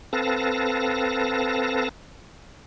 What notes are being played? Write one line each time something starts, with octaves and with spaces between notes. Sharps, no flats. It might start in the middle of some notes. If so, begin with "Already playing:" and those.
C4 A4 B4 F5 A5 A#6